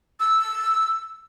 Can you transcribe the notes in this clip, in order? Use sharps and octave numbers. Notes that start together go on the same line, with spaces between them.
E6